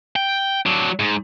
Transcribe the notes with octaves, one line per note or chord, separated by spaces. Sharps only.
G5
F#3 D4
G#2